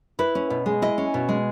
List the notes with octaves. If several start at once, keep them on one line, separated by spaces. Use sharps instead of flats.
E4 B4
C#4
B2
G#3
E4 D#5
C#4
B2
G#3